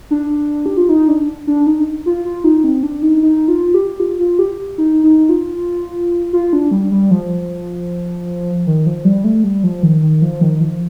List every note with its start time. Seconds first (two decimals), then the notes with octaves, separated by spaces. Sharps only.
0.11 D4
0.66 G4
0.77 F4
0.89 D#4
1.08 D4
1.47 D4
1.67 D#4
2.06 F4
2.25 F4
2.44 D#4
2.64 C4
2.83 D4
3.02 D#4
3.22 D#4
3.48 F4
3.74 G4
4.00 F4
4.19 F4
4.39 G4
4.78 D#4
5.03 D#4
5.29 F4
6.33 F4
6.53 D4
6.71 G3
6.91 G3
7.11 F3
8.67 D#3
8.86 F3
9.05 G3
9.24 A3
9.44 G3
9.64 F3
9.83 D#3
10.02 D#3
10.22 F3
10.41 D#3
10.60 F3